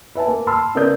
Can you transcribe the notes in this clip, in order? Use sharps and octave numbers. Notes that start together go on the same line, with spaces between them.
B4 E5 G#5 A5
A#3
A5 B5 C6 E6 F6
C#3 B3 A#4 D5 D#6 G6